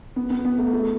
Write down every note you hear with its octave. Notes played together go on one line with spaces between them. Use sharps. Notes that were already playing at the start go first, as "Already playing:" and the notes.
B3
B3
B3
A3
A3